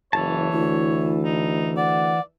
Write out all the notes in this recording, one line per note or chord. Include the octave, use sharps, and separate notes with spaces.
F#1 E3 C#5 A5
D2 E4
D#4
D5 F#5